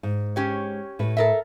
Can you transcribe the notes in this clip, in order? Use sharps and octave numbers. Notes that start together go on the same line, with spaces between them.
G#2
C#4 G4 C#5
A2 B4
A4 A#4 E5